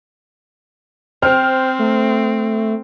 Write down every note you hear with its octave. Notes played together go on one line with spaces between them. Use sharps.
C4 C5 G5 F6
A3